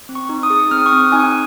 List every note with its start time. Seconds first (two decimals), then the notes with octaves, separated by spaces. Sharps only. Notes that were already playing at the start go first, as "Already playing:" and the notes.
0.09 C4
0.15 C#6
0.29 D#4
0.43 D#6
0.50 G#4
0.71 C4 F6
0.79 D#6
0.86 C#6
0.92 C4 D#6
1.12 D#4 G#5